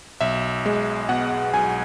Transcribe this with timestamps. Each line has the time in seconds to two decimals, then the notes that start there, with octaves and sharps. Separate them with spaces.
0.21 B1 E5
0.66 G#3
1.09 B2 F#5
1.53 B1 G#5